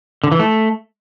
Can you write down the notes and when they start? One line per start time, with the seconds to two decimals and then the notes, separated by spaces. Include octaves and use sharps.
0.24 D3
0.32 E3
0.39 A3